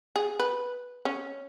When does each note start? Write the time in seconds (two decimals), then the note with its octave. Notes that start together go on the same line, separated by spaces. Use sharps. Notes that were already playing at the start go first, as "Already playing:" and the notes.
0.16 G#4
0.39 B4
1.05 C#4